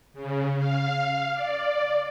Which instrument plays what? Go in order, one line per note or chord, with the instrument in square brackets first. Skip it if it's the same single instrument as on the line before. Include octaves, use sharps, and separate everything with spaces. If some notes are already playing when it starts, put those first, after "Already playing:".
[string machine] C#3
F5
D5